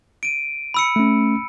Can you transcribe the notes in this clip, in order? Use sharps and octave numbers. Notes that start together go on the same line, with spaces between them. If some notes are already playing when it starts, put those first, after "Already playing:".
D7 D#7
B5 E6 C#7
A3 C#4